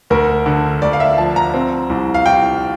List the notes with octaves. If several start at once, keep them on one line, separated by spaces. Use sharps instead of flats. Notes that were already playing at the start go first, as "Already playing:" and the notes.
D2 A#4
D3
D2 D5
F5
E5
F3 A5
A#5
C4
C2
F5
C2 G5